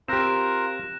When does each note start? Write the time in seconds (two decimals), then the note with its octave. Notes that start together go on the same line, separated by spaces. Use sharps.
0.08 C4 F4 G4 A#4 F#6 A#6 E7